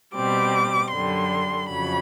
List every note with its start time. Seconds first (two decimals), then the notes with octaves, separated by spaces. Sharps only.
0.15 B2 G3 C4 D6
0.91 F#2 D3 G3 C6
1.69 F2 C#3 F#3 B5